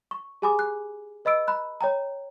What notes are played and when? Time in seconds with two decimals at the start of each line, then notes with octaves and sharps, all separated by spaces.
0.11 C#6
0.42 G4 G#4 G#5 B5 D6 D#6
0.59 F#6
1.25 B4 D#5 B5 E6 D7
1.48 A#5 B5 F#6
1.81 C#5 G5 A#5